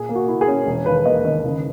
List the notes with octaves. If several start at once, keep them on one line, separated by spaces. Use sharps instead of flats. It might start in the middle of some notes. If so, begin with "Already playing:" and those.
Already playing: A#2 G#4
A#3
F#4
E4
G#4
C#4
E1
D#2 B4
A#3 D#5
D#3 D#5
F#1